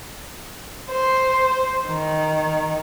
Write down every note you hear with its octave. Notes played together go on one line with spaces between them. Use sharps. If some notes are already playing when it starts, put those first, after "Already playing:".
C5
D#3